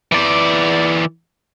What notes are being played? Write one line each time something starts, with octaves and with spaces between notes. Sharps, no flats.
E3 D5